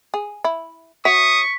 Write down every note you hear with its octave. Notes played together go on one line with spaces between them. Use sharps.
G#4
E4
F#4 C#5 E5 C#6 D#6 B6